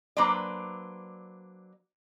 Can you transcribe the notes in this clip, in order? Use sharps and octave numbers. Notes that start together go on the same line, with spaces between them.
F#3 A#3 D4 B4 C5 D5